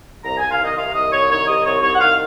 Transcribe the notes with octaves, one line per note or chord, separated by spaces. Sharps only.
C2 A#5
C2 G#5
F5
D#3 D#5
C3 F5
C2 D#5
C2 C#5
D#3 C#5
C3 D#5
C2 C#5
C2 C#5
F#5
D#3 F5